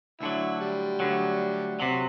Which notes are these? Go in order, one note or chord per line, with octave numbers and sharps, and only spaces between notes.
D2 D3 F#3 E4
G3
D2 D3 F#3
C3 F#3 F#4